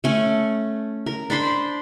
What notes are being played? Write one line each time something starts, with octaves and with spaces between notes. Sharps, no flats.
A3 C#4
A#4
D4 C5 B5 C6